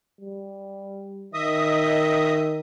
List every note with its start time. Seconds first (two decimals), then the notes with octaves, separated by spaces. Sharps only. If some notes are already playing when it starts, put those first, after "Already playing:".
0.21 G3
1.34 D#3 D#5 E5 D#6